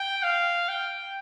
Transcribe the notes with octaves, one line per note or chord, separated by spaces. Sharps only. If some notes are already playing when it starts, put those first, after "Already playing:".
Already playing: G5
F5
G5